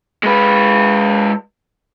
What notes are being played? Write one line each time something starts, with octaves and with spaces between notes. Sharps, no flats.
G#3 B4